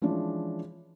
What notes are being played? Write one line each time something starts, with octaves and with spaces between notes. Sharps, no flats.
E3 F3 G#3 C#4 D4